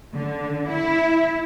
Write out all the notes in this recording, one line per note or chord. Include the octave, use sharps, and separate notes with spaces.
D3
E4